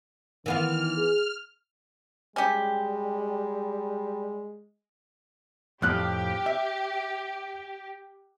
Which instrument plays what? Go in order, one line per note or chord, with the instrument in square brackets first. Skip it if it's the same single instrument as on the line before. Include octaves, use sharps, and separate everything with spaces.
[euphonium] D#3 [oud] E3 B3 F4 [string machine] F6
[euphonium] G#4
[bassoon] G3 [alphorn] G#3 [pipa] C#4 G4
[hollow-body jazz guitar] F2 A2 F3 [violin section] G4 [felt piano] F6 F#6
[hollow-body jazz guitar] E5